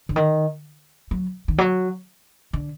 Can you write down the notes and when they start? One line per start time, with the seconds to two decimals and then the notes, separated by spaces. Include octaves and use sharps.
0.09 D3
0.16 D#3
1.11 F#3
1.48 D#3
1.58 F#3
2.53 D3